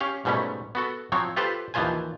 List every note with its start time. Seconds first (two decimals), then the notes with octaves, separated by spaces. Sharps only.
0.01 C#4 G4 F5
0.25 G#2 B2 G3 A3 C#4
0.75 B3 F#4 A4
1.12 F3 F#3 C4 C#5
1.36 F4 G4 A4 B4 C5
1.74 D#2 E3 F3 F4 C5 G#5